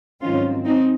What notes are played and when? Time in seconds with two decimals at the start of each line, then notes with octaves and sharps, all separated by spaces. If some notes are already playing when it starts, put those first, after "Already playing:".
0.22 G#2 D#3 F#3 C4 C#4 F4
0.66 C4 D#4